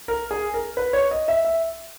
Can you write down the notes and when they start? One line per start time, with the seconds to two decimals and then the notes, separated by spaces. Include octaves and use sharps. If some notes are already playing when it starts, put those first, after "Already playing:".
0.08 A#4
0.31 G#4
0.54 A#4
0.77 B4
0.93 C#5
1.11 D#5
1.28 E5
1.44 E5